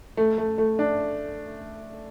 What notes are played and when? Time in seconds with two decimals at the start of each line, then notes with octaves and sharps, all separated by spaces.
0.17 A3
0.38 A3
0.58 A3
0.79 D4